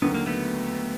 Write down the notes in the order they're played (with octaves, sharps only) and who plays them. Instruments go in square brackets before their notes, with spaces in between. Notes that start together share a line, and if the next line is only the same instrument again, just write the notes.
[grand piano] D#2 D3 F#3 [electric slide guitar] B3
[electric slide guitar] A#3
A3 B3